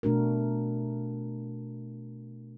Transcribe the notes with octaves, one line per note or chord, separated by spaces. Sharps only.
B2 A3 D4 F#4 A#4